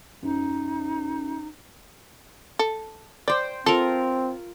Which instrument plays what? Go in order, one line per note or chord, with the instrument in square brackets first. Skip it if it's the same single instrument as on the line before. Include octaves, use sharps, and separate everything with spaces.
[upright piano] F#2 [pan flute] D#4
[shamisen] A4
[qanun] C5 G5 [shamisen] D5
[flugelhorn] C4 [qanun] F4 A#4 [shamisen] A4